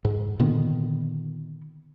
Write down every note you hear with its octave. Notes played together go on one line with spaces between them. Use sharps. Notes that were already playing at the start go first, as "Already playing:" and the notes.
G#2
A#2 D3 D#3 B3